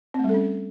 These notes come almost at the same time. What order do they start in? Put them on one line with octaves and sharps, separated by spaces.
C4 A3 G3 A4 C#4